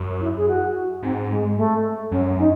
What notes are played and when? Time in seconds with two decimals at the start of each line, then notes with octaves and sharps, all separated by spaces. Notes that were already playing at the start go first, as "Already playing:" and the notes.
Already playing: F#2
0.21 E4
0.37 G#4
0.48 F#4
1.02 G#2 C4
1.30 G#3
1.57 A3
2.11 F#2 C#4
2.39 D#4